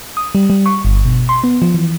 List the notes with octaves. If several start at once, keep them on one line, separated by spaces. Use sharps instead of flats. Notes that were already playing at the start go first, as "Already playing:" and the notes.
D#6
G3
G3
C#6
G1
B2
C6
B3
F3
E3